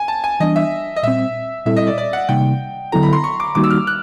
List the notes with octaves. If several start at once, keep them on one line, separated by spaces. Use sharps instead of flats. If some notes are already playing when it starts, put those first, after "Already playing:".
Already playing: G#5
A5
G#5
E3 G3 B3 D4 D#5
E5
D#5
A#2 G3 C4 E5
A#2 G3 C4 E4 A4 E5
D#5
D5
D5
F#5
C3 D#3 G3 A#3 D#4 G5
D3 F#3 B3 E4 A4 A#5
B5
C6
C#6
D6
D#3 G3 A#3 D#4 F#4 D6
E6
F6
F#6